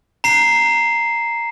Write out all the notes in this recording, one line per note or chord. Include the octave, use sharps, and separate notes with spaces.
A#5 C7 E7